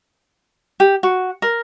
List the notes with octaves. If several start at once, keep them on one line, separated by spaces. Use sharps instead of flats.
G4
F#4
A#4